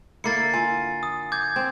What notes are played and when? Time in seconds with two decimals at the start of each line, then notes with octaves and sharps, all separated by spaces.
0.24 D3 A#3 E4 A6 C7 C#7
0.54 F4 G#5
1.03 D#6
1.32 D6 G6 G#6
1.56 C4